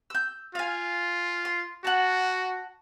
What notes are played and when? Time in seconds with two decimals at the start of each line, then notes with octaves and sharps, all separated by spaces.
0.10 E6 G6
0.55 F4 F5 G#5
1.45 C6
1.85 F#4 F#5 A5